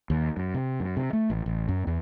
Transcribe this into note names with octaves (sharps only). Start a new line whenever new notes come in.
D#2
F#2
C3
F#2
C3
A3
A1
A1
F#2
E2